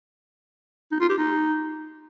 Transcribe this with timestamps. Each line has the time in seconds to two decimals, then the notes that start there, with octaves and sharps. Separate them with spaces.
0.92 D#4
1.00 F4
1.09 G4
1.18 D#4